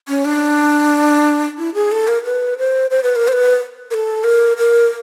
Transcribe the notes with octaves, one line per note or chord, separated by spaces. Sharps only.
C#4
D4
E4
G#4
A4
A#4
B4
C5
C5
B4
A#4
C5
B4
A#4
A4
A#4
A#4